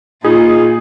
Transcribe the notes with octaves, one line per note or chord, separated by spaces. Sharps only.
A#2 D#4 F4 G#4